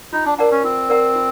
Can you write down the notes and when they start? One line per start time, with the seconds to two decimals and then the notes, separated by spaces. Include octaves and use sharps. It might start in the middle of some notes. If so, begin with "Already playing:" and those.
0.13 D#4 F4
0.25 D4
0.38 D4 A#4 D5 F#5 A#5
0.51 C#4
0.64 C4 F4
0.89 A#4 D5 F#5 A#5
1.15 F4